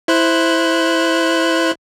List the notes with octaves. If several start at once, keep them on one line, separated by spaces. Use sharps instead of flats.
E4 C5 F#6